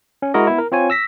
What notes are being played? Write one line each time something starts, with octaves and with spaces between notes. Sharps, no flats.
C#4
G#3 E4 F#4 A#4 D#5
B3 E4
A#4
C4 F4 C#5 G#5
E6 A#6 B6